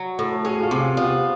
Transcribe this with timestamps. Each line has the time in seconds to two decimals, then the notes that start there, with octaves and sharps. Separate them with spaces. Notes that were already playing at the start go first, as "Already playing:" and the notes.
Already playing: F#3
0.19 A2
0.45 C#4 F#4 G#4
0.63 F4
0.71 C3
0.80 F4
0.97 B3 F4